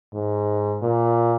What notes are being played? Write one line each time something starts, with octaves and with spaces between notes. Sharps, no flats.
G#2
A#2